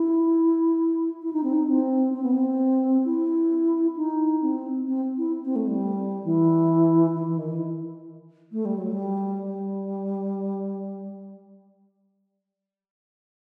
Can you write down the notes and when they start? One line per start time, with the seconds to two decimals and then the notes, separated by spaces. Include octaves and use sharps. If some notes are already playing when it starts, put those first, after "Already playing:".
Already playing: E4
1.23 E4
1.33 D#4
1.43 C4
1.53 D#4
1.68 C4
2.14 C4
2.23 B3
2.32 C4
3.05 E4
3.96 D#4
4.42 C4
4.87 C4
5.18 E4
5.45 C4
5.56 A3
5.67 G3
6.24 E3
7.16 E3
7.27 E3
7.38 D#3
7.50 E3
8.52 A3
8.65 G3
8.78 F#3
8.91 G3
9.43 G3